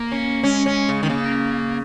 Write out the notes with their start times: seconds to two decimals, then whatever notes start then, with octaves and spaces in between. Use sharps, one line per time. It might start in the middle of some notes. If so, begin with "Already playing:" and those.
Already playing: A#3
0.12 C#4
0.43 G#3 C#4
0.66 C#4
0.89 C#3
1.03 D#3
1.10 C#3 A#3